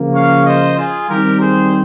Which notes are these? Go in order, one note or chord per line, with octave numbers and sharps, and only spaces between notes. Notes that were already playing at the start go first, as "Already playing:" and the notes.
Already playing: C#3 F3 A#3
C#5 F5
C5 D#5
F4 G#4
D#3 G3 C4 G4 A#4
G#4 C5